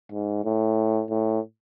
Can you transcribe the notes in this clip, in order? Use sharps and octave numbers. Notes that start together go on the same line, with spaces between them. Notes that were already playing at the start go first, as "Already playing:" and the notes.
G#2
A2
A2